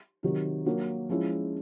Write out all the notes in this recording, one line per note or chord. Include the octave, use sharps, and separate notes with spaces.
C3 D#3 F#3
F#3 A#3 D4
F3 G#3 C#4 E4